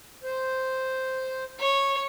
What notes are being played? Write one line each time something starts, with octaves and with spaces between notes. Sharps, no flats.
C5
C#5